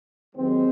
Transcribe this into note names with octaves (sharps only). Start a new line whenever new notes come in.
D#2 D#3 F#3 G#3 C4